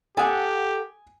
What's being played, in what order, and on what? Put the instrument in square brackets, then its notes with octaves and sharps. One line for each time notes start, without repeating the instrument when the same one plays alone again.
[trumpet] G4 [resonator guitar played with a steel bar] A4 F#5 [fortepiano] G#5 D#6